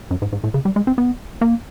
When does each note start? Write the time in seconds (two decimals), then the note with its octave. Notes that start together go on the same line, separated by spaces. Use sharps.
0.11 F#2
0.22 G#2
0.32 G#2
0.44 A2
0.54 C#3
0.65 G3
0.76 G#3
0.87 C4
0.98 B3
1.41 A#3